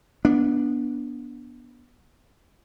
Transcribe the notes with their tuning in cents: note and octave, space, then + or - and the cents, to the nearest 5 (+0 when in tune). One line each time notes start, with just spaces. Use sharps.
B3 -20 D4 -15